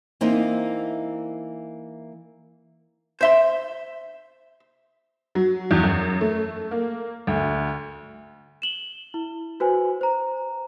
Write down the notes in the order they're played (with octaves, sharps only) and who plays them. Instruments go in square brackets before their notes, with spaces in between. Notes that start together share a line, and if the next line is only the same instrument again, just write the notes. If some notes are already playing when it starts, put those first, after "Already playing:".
[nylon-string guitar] E3 A#3 C4 D#4
[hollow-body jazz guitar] C5 E5 C6
[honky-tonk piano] F#3
E2
F#2
A3
A#3
D2
[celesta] E7 F#7 G7
E4
F#4 B4 C5 G#5
C5 A#5